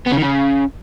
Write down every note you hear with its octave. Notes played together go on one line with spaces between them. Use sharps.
B3
C#3
D#3
C#3